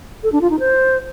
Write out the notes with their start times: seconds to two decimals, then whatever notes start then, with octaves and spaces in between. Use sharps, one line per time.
0.23 A4
0.32 D4
0.41 F4
0.50 D#4
0.59 C5